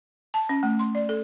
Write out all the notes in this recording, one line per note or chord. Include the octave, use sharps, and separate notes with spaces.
A5
C#4
A3
C6
D5
A4